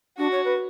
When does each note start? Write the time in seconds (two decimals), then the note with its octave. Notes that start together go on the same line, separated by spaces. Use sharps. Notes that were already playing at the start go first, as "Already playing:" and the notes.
0.18 D4 F#4
0.31 C#5
0.45 B4